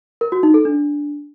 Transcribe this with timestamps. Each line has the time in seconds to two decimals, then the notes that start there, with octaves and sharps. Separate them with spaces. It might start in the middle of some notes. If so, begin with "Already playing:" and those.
0.21 A#4
0.32 F#4
0.43 D#4
0.54 A4
0.65 D4